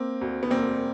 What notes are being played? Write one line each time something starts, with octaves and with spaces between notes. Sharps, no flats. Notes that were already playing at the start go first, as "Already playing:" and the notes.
Already playing: A#3 C4
D2
B3
E1 A#3 C4